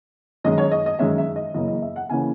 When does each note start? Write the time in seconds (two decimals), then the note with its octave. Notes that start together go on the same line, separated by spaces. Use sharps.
0.44 F#2 D#3 G#3 C#4 D#5
0.58 C#5
0.71 D#5
0.86 D#5
0.99 F#2 D#3 G#3 C#4 E5
1.18 E5
1.36 D#5
1.54 F#2 C#3 E3 A#3 C#4 D#5
1.68 D#5
1.82 E5
1.96 F#5
2.09 C#3 E3 A#3 C#4 G#5